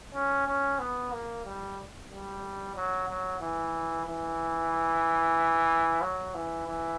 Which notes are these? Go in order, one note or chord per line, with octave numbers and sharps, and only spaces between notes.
C#4
C#4
B3
A#3
G3
G3
F#3
F#3
E3
E3
F#3
E3
E3